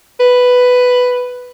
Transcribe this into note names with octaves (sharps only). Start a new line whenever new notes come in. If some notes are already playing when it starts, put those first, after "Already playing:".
B4